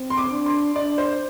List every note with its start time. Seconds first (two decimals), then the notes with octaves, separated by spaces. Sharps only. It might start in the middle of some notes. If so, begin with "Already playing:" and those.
Already playing: C4
0.10 C6
0.17 D6
0.31 D4
0.46 C6
0.75 D4 D5
0.98 C5